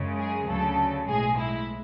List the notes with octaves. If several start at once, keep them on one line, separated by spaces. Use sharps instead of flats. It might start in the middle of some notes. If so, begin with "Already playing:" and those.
Already playing: F#2 C#3 G#3
G#4
D2 C#3 F#3 A4
B1 A2 G#3 G#4
E4